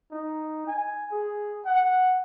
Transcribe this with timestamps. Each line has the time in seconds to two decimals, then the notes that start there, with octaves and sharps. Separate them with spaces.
0.11 D#4
0.67 G#5
1.12 G#4
1.65 F#5